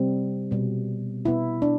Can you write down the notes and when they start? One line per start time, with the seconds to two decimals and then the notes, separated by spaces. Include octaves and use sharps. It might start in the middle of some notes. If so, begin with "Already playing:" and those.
Already playing: C3 G3 C4
0.51 B2 G3 B3
1.25 B2 B3 E4
1.62 D4